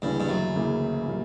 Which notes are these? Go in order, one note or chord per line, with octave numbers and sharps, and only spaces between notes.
D2 G2 C#3 E3 A#3 E4
G2
F#2
D2 C#3 E3 A#3 E4
A#2 G3 A#3